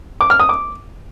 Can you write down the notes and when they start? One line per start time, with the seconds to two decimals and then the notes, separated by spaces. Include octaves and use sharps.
0.21 D6
0.30 F6
0.40 D#6
0.49 D6